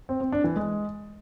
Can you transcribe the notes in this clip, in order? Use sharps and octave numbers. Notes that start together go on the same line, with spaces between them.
C4
C4
D4
E3
G#3